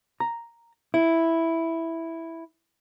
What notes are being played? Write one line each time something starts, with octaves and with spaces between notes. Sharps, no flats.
A#5
E4